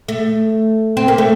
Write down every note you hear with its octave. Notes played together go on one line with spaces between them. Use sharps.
A3
C4
A#3
A3